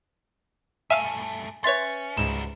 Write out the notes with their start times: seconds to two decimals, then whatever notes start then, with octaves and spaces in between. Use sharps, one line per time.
0.90 G2 A3 E5 F5 G#5 E6
1.64 C#4 B4 C#5 E5 C6 A6
2.17 C#2 G#2 F#3 G3 E7